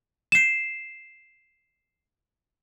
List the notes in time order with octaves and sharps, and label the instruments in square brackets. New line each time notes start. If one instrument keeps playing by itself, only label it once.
[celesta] C7 E7